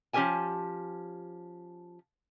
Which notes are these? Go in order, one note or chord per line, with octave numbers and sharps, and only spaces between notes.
F3 C#4 G4 A#4 G#5 A5